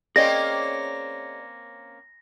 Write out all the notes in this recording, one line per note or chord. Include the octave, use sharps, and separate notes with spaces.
A#3 C4 C#4 G#4 D5 D#5 A#6